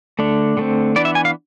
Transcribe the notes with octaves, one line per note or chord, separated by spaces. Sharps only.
D3 A3 D4
D3 A3 C4
E3 B3 D4 D5
E5
G#5
F5